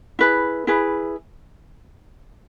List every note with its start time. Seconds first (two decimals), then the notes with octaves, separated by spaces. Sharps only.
0.19 E4 G#4 B4
0.67 E4 G#4 B4